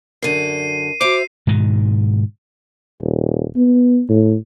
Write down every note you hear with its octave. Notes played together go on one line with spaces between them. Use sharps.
F#2 D3 A#4 C7 D#7
F#4 C5 E5 D6 C7 F7
G#2 B2 D#3
D#1
B3
A2